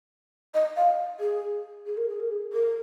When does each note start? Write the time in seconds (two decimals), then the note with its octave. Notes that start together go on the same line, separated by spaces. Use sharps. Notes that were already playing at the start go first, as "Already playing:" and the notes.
0.54 D#5
0.76 F5
1.20 G#4
1.86 G#4
1.97 A#4
2.09 G#4
2.20 A#4
2.31 G#4
2.53 A#4